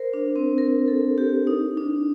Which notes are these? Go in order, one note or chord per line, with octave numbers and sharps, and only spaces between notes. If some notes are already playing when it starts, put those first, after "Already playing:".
Already playing: A#4 C5
D4
C4
A#4
A4
G4
D#4
D4